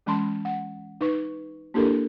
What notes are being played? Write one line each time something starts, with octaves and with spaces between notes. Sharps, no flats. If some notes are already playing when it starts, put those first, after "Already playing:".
E3 G#3 C#4 A5 B5 C6
F#5
D#4 B4 C#6
A#3 D4 E4 G4 A4 A#4